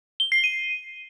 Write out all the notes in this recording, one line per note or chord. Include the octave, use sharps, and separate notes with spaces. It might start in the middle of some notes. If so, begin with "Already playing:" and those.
G7
C7
D#7